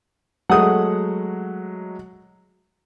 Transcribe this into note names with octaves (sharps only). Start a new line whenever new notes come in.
F#3 G#3 A3 F#5 D#6